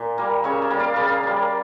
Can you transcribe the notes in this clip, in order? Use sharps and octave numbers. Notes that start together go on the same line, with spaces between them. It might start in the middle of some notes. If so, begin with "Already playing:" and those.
Already playing: A#2 D5
G3 A#3
C#3 C#5 E5
D5 F5
G3 A#3
D5 F5
C#3 D5 F5
G3 A#3